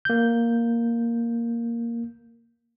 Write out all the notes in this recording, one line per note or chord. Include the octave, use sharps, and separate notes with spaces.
A#3 G6